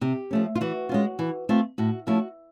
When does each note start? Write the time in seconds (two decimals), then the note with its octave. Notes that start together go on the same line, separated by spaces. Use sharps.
0.01 C3 G4
0.31 F3 A3 C#4
0.55 F4
0.61 E3 F#4
0.89 G#3 C#4 F4
1.19 E3
1.49 A3 C4 F4
1.78 A2 F#4
2.07 F3 A3 C#4 E4 F#4